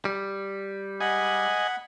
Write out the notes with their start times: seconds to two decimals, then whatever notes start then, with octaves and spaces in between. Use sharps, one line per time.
0.05 G3
1.00 D#5 F#5 G#5 B5